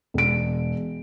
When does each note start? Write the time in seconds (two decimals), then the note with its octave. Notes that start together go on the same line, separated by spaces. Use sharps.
0.14 E1 D7